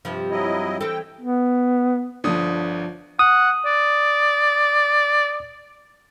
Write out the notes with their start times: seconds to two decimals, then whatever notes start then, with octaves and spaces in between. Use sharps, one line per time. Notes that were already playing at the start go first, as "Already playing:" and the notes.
0.05 G2 C3 F3
0.31 F#3 E4 D#5
0.81 E3 C4 A4 G5
1.21 B3
2.24 G1 D3 F3 D4 D#6
3.19 F#5 D#6
3.65 D5